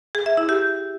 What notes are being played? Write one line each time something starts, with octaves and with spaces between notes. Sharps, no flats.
G#4
E5
E4
G4